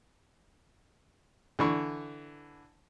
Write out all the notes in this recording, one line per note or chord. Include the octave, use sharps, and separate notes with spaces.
D3 E3 C#6